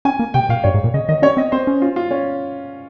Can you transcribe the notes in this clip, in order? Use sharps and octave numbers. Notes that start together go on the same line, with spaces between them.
C#4 G#5
A#3
C3 G5
A#2 F5
G2 C#5
G#2
A#2
C#3 D#5
D#3 D#5
C#4 C#5
C4 D#5
C4 C5
C#4
F4
F4
C#4